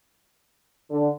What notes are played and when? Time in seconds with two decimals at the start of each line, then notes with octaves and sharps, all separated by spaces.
0.90 D3